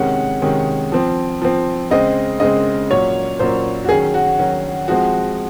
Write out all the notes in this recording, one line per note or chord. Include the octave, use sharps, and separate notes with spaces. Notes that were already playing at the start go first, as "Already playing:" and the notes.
Already playing: C3 D#3 G#3 C#4 F#5
C3 D#3 G#3 C#4
F3 C4
F3 C4
C#3 G#3 C4 D#5
C#3 G#3 C4 D#5
A#2 F#3 A#3 C#4 C#5
A#2 F#3 A#3 C#4 C5
F#4
D#3 F#3 C#4 G#4
F#4
D#3 F#3 C#4
F3 G#3 C4 F#4